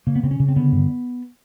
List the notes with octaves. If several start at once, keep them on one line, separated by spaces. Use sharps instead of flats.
C#3 A#3
B3
C#3 C4
C#4
C#3
C4
D3 B3
G2